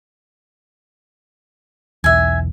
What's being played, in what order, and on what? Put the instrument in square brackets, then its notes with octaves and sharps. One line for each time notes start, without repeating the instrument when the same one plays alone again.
[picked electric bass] B1 E2 [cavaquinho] E5 G#5